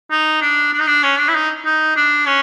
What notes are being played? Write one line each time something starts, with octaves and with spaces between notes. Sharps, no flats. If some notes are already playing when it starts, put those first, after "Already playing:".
D#4
D4
D4
D#4
D4
C#4
D4
E4
D#4
D#4
D4
C#4